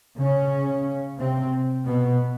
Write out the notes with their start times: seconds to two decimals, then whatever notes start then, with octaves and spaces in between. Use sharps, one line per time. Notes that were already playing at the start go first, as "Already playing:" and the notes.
0.20 C#3 C#4
1.19 C3 C4
1.86 B2 B3